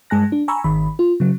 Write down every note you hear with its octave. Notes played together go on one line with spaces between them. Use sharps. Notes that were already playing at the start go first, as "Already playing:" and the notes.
G2 G#3 G#5 A5 F#6 A#6
D4
G#5 A#5 B5 C#6 E6
G#1 D#3 B5
F4
C#3 F#3